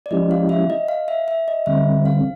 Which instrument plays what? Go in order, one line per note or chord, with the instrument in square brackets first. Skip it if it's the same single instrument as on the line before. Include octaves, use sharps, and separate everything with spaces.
[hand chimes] D5
[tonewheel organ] F3 G#3 C#4 E4 G4 [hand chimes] D#5
[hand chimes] F5
E5
D#5
F5
E5
E5
D#5
[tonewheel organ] D3 G3 C4 [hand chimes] E5
[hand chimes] F5